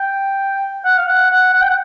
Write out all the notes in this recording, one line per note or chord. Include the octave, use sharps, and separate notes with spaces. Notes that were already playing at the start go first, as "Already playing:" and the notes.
Already playing: G5
F#5
F5
F#5
F#5
F#5
G5
F#5